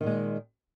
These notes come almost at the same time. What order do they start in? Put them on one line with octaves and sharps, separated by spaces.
D#3 A#2 G#3